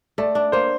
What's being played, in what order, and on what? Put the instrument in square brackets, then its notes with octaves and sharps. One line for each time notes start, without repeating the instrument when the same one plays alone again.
[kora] A3 [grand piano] D5
[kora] D4
[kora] A#3 [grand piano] C5